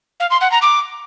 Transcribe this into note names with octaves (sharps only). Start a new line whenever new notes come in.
F5
C6
F#5
A#5
D6